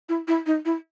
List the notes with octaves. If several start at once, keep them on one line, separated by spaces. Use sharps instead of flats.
E4
E4
D#4
E4